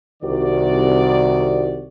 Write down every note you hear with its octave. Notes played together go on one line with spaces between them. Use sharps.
C2 D#3 F#4 D5